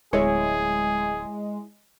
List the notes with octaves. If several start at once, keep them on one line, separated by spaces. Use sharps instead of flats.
D1 G#3 E4 G#4 C#5